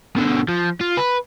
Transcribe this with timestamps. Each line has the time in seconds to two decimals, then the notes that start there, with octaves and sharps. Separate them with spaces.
0.16 B2 D3
0.49 F3
0.81 F4
0.97 B4